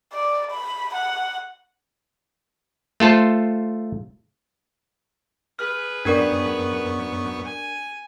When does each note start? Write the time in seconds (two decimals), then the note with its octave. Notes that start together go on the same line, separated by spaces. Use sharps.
0.13 D5
0.51 B5
0.95 F#5
3.00 A3 F4 A4 C5
5.59 G#4 B4 F6
6.05 F#2 B3 D4 A#4 D5 C#6
7.45 G#5